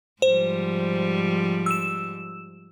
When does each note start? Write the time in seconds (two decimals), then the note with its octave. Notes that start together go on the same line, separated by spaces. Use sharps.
0.22 G#2 F3 G3 C5
1.66 E6 E7